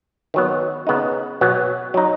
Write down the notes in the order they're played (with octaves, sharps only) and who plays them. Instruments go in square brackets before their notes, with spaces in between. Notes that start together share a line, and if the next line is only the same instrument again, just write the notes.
[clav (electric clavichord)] D#3 F#3 B3
C#3 B3 D#4
B2 F#3 B3
F#3 D#4